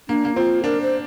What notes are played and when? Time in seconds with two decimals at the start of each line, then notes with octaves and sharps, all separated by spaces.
0.09 A#3 D4
0.25 A#3
0.36 C4 F4
0.64 D4 A#4
0.82 C5